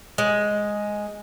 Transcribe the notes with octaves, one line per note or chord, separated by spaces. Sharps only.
G#3